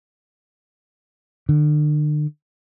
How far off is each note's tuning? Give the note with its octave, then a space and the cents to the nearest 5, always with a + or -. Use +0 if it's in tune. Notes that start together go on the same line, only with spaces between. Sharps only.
D3 +40